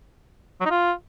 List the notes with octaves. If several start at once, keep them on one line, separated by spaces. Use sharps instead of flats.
F#3
D#4
F4